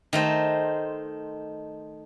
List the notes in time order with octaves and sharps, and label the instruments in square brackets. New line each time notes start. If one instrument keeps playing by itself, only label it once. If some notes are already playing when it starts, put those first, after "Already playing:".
[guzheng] D#3 A3 C5